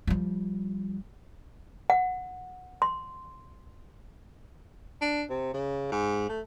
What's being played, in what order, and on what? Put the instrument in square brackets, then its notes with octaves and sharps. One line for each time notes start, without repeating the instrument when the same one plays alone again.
[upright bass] F3 G3
[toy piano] F#5
C6
[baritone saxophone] D4
C3
C#3
G#2
A3